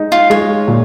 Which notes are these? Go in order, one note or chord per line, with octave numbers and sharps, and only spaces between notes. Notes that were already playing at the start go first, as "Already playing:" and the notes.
Already playing: G#3 D#4
F4
G#3 C#5
A#2